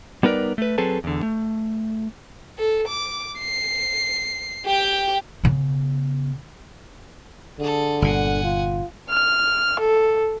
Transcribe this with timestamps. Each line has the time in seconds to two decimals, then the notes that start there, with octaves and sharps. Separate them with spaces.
0.23 G3 B3 D#4 A#4 B4 D5
0.58 A3 B4
0.78 F#3 C4 G#4 A4 B4 A5
1.04 E2 D3
1.23 A3
2.58 A4
2.88 D6
3.40 C7
4.66 G4 G5
5.43 C#3 B3
7.59 D3 G#4 A4
8.02 G1 A#2 F#5 G#5
8.44 F4
9.10 F6
9.80 A4